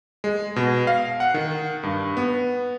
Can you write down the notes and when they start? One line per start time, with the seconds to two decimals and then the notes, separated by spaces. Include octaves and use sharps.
0.24 G#3
0.56 B2
0.87 F5
1.20 F#5
1.34 D#3
1.83 G2
2.17 B3